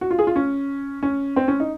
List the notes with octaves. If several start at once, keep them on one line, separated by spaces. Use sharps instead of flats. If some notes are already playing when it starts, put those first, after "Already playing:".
F#4
F4
G#4
F4
C#4
C#4
C4
C#4
D#4